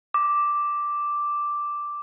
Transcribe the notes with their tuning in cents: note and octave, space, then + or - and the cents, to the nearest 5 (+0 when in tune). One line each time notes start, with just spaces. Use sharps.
D6 +0